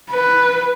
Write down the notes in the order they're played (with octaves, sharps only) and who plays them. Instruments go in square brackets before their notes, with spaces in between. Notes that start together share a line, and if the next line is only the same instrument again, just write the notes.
[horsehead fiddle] B4